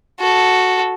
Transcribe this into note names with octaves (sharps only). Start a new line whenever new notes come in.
F#4 A4